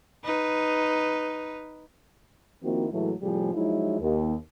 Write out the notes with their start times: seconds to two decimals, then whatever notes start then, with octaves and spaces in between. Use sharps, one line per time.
0.24 D#4 B4
2.63 D#3 F3 A#3 C4 E4 F#4
2.92 A2 E3 F#3 G#3 A3
3.22 A2 C3 F3 G3 G#4
3.54 F3 F#3 G#3 D#4 E4
4.00 D#2